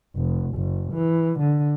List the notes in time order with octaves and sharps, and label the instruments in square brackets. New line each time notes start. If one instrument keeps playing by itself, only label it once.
[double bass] F1
F#1
E3
D3